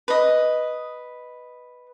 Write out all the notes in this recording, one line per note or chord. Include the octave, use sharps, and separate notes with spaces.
B4 D#5